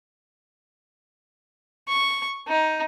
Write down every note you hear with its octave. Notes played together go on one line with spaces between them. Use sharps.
C#6
D#4